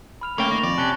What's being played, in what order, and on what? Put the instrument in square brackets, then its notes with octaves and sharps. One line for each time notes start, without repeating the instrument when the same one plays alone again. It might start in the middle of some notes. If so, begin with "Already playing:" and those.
[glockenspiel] B5 F6 F7
[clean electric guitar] A3 C#4 G5 [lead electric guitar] A#3 [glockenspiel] C#6 G7
[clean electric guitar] D#3 [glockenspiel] A#6 F7
[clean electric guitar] F2 [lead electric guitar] D5
[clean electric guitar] C3 C#4 [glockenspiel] A5 F#6 G7